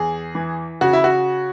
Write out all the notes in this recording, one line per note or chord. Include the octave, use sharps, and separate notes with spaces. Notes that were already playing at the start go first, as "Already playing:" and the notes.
Already playing: E2 G#4
E3
C#3 F#4
E4
F#4